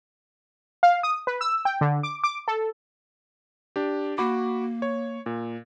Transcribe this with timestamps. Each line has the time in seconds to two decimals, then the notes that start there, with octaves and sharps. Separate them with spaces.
0.83 F5
1.03 D#6
1.27 B4
1.41 E6
1.65 G5
1.81 D3
2.03 D6
2.24 D6
2.48 A4
3.76 D4 G4
4.18 A#3 F#4 B5 D6
4.82 C#5
5.26 A#2